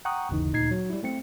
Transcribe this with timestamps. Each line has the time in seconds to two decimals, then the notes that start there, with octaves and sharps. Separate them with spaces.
0.05 F#5 G5 A#5 C#6 D#6 F#6
0.29 G1 D#2 C#3 E3 D#4
0.52 D2 A#2 D#4 G#6 C7
0.71 F#3
0.90 G3 E4
1.03 A3 C4 C#7